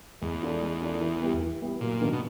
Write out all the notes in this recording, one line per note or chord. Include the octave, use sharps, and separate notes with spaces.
E2 G#3
C#4 F4 A4 D5
G#3
C#4 F4 A4 D5
E3
G3 B3 E4 G4
E3
G3 B3 E4 G4
F#2 A#2
D#3 F#3 B3 D4
B2